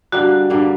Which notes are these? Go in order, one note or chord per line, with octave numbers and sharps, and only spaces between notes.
G2 D3 G3 A#3 F#4
G2 D3 G3 A#3